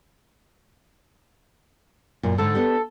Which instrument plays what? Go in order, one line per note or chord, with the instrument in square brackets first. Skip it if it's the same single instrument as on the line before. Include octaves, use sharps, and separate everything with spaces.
[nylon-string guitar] F#2 [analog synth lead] A#2
[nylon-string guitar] G#2 D3 [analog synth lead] A4
[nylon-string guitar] B3 D4 G4